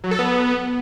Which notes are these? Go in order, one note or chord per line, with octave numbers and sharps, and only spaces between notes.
F#3
A4
B3